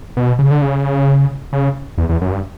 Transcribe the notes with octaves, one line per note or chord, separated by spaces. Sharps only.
B2
C#3
D3
C#3
C#3
E2
E2
F#2
G2